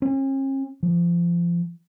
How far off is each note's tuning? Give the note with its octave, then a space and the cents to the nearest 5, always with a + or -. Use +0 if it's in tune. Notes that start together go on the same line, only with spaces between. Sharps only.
C#4 -45
F3 -25